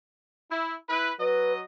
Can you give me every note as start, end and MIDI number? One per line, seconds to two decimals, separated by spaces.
0.50 0.74 64
0.88 1.11 64
0.88 1.11 71
1.19 1.61 54
1.19 1.53 71
1.19 1.61 75